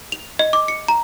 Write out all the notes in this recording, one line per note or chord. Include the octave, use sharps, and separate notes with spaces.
F7
D#5
D6
C#7
A#5